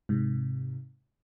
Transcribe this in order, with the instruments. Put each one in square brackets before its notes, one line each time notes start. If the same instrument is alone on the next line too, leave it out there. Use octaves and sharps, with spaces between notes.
[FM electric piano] G#2 C3